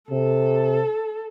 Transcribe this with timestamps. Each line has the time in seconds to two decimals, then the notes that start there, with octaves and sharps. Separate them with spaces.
0.11 C3 A4